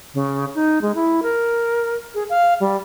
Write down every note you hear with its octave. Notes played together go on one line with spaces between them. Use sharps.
C#3
D#4
G#3
E4
A#4
G#4
F5
G3